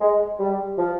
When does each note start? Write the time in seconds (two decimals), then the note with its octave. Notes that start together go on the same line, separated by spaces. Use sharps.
0.01 G#3
0.39 G3
0.78 F3